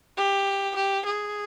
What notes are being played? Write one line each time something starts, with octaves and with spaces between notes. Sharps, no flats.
G4
G4
G#4